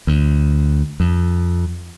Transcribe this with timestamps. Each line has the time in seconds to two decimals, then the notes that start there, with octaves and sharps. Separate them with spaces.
0.07 D2
1.00 F2